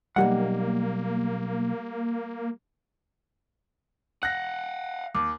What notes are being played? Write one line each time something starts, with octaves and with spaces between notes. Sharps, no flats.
B1 F3 G3 A#3 G4 D5 F#5
F5 F#5 F#6 A#6
D#2 D6